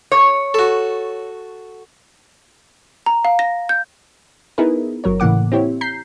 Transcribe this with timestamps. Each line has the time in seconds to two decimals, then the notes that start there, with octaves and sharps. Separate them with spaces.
0.12 C#5
0.54 F#4 A4
3.06 A#5
3.25 F5
3.39 A#6
3.69 G6
4.58 B3 D#4 E4 G#4 A#4 B4
5.04 G1 F#3 A#4 C#5
5.20 A2 C#3 E3 A#3 F#5 D6
5.52 C4 E4 G4 C#5
5.81 A#5 G6 B6 C7